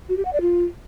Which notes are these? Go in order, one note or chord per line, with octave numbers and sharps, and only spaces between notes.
F#4
G4
F#5
D5
F4